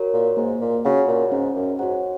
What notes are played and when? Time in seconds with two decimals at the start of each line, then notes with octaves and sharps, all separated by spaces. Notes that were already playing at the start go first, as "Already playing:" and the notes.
Already playing: F#4 A#4 C#5
0.14 A#2
0.37 G#2 A#3
0.61 A#2
0.85 C#3 F#4 C#5 F#5
1.08 A#2
1.32 G#2 C#4
1.55 F#2
1.79 G#2 F#4 C#5 F#5